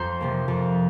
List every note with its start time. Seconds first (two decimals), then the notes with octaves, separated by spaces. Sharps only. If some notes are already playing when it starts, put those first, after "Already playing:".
Already playing: F2 C5 A#5 C6
0.20 C3 F3 A#3
0.48 F2